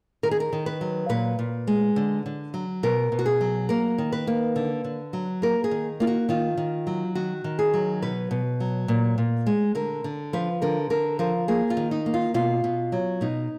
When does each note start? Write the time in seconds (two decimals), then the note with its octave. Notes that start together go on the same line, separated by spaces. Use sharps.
0.23 D#3 A#4
0.31 G#4
0.40 A#4
0.53 D#3
0.66 B4
0.81 F#3
1.09 A#2 B4
1.39 A#2
1.67 G#3
1.96 D3
2.26 D3
2.54 F#3
2.83 B2 A#4
3.12 B2
3.19 F#4
3.26 G#4
3.41 F#3
3.69 A#3 A#4
3.98 D#3
4.13 B4
4.27 A#3
4.56 D3
4.84 D3
5.13 F#3
5.42 A#3 A#4
5.64 G#4
5.71 D#3
6.00 A#3 F4
6.07 F#4
6.29 D#3 F4
6.57 D#3
6.87 F#3
7.15 D#3 F#4
7.44 D#3
7.59 G#4
7.74 F#3
8.02 B2 B4
8.31 B2
8.60 F#3
8.88 A#2
9.18 A#2
9.46 G#3
9.75 D3 A#4
10.04 D3
10.33 F3 B4
10.62 D3 A#4
10.90 D3 A#4
11.19 F3 A#4
11.48 A#3 G#4
11.70 F4
11.77 D#3
11.91 D#4
12.06 A#3
12.14 F4
12.34 B2 F4
12.64 B2
12.92 F#3
13.21 B2 D#4